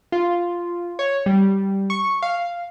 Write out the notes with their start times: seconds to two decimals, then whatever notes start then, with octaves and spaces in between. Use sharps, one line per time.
0.12 F4
0.99 C#5
1.26 G3
1.90 C#6
2.22 F5